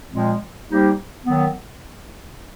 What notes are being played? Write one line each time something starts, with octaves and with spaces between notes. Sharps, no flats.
A#2 F3 G#3 C4
G3 A#3 D#4 G4 C5
D#3 F#3 B3